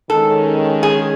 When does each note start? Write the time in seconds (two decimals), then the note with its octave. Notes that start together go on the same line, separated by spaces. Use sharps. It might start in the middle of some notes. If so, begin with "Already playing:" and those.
0.10 D#3 G#3 C#4 A4
0.83 G#4